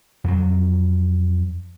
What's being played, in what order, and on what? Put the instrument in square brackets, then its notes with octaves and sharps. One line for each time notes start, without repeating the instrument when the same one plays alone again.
[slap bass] F2 F#3